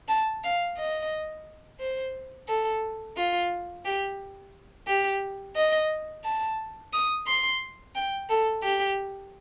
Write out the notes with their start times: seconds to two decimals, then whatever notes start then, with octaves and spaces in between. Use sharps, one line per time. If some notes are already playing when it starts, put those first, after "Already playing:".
0.09 A5
0.44 F5
0.78 D#5
1.80 C5
2.48 A4
3.17 F4
3.85 G4
4.88 G4
5.56 D#5
6.25 A5
6.93 D#6
7.27 C6
7.96 G5
8.30 A4
8.63 G4